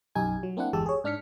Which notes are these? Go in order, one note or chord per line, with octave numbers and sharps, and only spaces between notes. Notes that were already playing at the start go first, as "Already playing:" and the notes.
B1 F#2 D#4 G4 G#5 G#6
F#3
A#3 C4 D4 E4 F#5
G1 E2 G#3 G4 A5 E6
G#4 C#5
G#2 D4 F6 B6 C#7